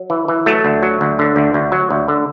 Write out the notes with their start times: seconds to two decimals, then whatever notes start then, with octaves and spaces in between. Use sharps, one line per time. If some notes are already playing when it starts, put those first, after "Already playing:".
Already playing: F#3
0.10 E3
0.28 E3
0.46 F#3 A3
0.64 D2
0.83 F#3
1.01 D2
1.19 D3
1.36 D2
1.54 D2
1.72 F#3
1.90 D2
2.08 D3